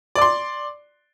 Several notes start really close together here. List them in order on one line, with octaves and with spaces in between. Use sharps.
D5 D6 C6